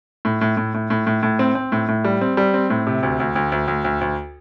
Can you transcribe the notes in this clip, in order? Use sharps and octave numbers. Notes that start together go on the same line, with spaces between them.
A2
A2
A2
A2
A2
A2
A2
C4
C4
A2
A2
G3
C4
G3
C4
A2
C3
D2
D2
D2
D2
D2
D2
D2